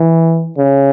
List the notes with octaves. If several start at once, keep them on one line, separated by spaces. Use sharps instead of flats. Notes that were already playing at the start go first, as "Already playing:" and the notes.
Already playing: E3
C#3